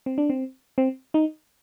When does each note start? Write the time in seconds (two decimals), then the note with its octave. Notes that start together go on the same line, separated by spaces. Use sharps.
0.06 C4
0.18 D4
0.30 C4
0.78 C4
1.14 D#4